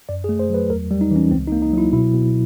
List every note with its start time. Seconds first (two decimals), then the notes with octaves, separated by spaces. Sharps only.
0.09 F#2 D5
0.24 G#4
0.29 A3
0.39 C5
0.50 F#3 B4
0.70 E2 A#4
0.91 G3
1.01 D#4
1.11 E3 C#4
1.31 C#2 C4
1.47 D#4
1.52 A#3
1.62 D#4
1.73 F#3 E4
1.93 B2 E4
2.14 B2